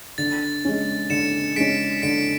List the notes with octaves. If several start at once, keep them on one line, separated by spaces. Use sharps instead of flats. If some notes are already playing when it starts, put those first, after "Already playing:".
D3 A6
G#3 C#4
D3 C#7 E7
G#3 C#4 B6 D7
D3 B6 D7